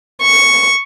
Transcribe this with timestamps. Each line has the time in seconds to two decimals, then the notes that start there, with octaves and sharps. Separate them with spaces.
0.22 C#6